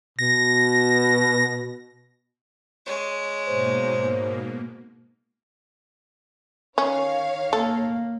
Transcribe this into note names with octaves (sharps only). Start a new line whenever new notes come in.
B2 A#6
G#3 C#5
G#2 B2 A#3 C5
D#3 C#4 C#5 F5
A#3 A4